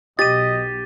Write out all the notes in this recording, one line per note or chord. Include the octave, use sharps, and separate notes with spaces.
B1 G4 D#5 A6 D#7